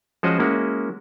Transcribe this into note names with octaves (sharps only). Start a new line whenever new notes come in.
F3 G#3 C#4 F#4 C5 D#5
G#3 A#3 C#4 E4 F#4